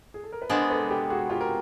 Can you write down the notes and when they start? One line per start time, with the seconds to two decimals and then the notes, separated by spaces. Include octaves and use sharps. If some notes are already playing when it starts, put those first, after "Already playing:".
0.14 G#4
0.23 A4
0.32 A#4
0.42 B4
0.50 G#3 B3 D4 A#4 C5
0.70 A4 B4
0.90 G4 A4
1.10 F#4 G#4
1.30 F4 G4
1.41 A#4